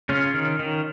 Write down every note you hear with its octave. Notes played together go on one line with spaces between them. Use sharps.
C#3 C#4 F4
D#3
D#3